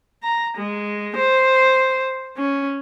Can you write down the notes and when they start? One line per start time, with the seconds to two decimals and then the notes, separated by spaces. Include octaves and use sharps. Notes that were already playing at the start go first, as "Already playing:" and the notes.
0.23 A#5
0.58 G#3
1.17 C5
2.37 C#4